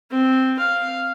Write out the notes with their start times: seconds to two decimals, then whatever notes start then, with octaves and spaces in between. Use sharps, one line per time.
0.11 C4
0.59 F5